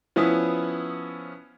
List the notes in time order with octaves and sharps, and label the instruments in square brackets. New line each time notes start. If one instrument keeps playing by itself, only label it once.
[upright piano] F3 B3 C#4 E4 D#6